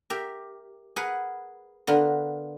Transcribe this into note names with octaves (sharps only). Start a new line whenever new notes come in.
G4 A#4 E5
G#4 A#4 B4 F#5
D3 B3 F4 A#4